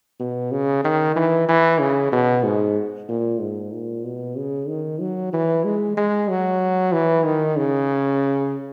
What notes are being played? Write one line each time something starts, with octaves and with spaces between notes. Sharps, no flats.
B2
C#3
D#3
E3
E3
C#3
B2
G#2
A#2
G#2
A#2
B2
C#3
D#3
F#3
E3
G#3
G#3
F#3
E3
D#3
C#3